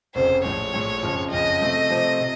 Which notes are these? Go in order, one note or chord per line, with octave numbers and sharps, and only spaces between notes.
F1 F2 C#3 C5
A#1 A2 F3 C#5
A#1 A2 F3
F#1 F2 C#3 F3
F#1 F2 C#3 F3 D#5
C3 F3 A3 C4
C3 F3 A3 C4
C3